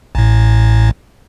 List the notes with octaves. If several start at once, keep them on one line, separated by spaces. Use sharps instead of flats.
A1 A2